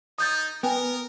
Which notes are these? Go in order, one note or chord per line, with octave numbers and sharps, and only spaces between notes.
D#4 D#6 G6 A6
B3 A#4 G5 G#5